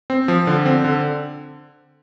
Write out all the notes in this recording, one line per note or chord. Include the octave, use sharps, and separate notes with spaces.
C4
F3
D3
C4
D3